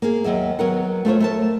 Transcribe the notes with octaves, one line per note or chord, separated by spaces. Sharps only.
A#3 G#4
D#2 F#3 E5
F#3 B3 A#4 F#5
A3 F4 C5 C#5
A3 A#4 A5